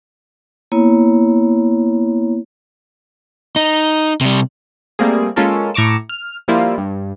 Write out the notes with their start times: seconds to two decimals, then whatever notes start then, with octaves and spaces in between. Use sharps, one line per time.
0.72 A#3 B3 E4 C#5
3.56 D#4
4.21 C3 G3
4.99 G3 A3 A#3 C4 G#4
5.36 G#3 A#3 C#4 F4 A4 A#4
5.74 A2 A#5 C#6 D6 E7
6.09 F6
6.48 F3 G3 A#3 E4 F4
6.78 G2